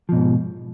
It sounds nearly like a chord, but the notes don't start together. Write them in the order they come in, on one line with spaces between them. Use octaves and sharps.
F3 B2 G#2